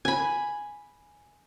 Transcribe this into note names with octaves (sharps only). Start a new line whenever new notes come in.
G#5 B5